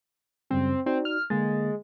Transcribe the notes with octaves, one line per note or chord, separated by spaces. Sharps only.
F#2 C#3 G3 C4
C4 D#4 F#4 D5
F6
D3 G#3 A#3 A6